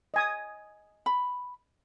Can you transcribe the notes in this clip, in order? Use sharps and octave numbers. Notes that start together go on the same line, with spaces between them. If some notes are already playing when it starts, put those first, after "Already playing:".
D#5 G#5 D#6
B5